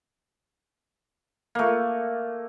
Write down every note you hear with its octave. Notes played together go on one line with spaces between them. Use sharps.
A3 A#3